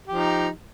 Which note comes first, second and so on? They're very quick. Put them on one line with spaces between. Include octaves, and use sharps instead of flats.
G4 F3 D#4